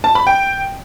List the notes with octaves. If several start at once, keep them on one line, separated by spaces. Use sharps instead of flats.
A5
B5
G5